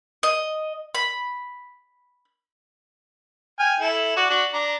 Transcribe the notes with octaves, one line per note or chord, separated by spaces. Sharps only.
D#5
B5
G5 G#5 F6
E4 A4
F#4 D5
D4 F#4
D4 A#5